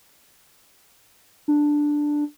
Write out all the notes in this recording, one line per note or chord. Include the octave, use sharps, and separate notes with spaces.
D4